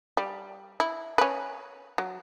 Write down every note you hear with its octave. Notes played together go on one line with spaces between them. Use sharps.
G3
E4
C#4 B4
F#3